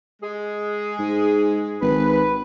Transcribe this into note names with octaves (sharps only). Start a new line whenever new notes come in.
G#3 G#4
G#2
G#1 B4